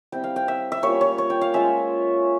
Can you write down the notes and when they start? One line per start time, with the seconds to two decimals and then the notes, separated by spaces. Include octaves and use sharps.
0.12 G3 C4 E4 G5
0.24 F5
0.36 G5
0.48 E5
0.72 E5
0.83 G3 A#3 C#4 F4 C#5
1.01 C#5
1.18 C#5
1.30 G5
1.41 F5
1.54 G#3 C#4 F4 E5